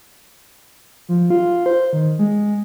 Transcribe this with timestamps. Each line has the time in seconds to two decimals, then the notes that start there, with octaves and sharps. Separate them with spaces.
1.09 F3
1.30 F4
1.66 C5
1.93 D#3
2.19 G#3